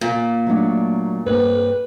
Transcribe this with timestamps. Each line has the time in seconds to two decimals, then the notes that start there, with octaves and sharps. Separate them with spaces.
0.01 A#2 A#3
0.47 F#3 A3 D4
1.27 G2 A#3 C4 B4